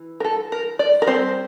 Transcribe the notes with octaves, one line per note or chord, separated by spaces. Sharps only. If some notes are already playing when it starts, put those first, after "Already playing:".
Already playing: E3
A#4
A4
A#4
D5
A#4
G3 C4 C5